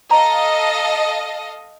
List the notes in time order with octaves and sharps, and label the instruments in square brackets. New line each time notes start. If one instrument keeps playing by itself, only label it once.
[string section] A4 D#5 F5 [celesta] A#5